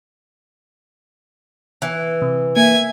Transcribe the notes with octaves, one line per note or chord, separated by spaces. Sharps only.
E3
C3
A#3 E5 G#5